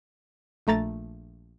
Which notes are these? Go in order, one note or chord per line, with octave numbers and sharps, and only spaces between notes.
A#1 A3 A#5 A6